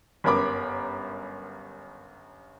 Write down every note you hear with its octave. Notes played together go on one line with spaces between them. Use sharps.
G1 F#2 A#4 B5 D6